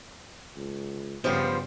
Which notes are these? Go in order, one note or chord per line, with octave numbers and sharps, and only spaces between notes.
C#2
G2 C#3 F3 G3 B3 C5